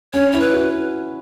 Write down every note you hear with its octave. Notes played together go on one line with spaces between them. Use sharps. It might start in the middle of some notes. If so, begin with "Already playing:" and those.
C#4 C#5
E4 C#5
B4
F#4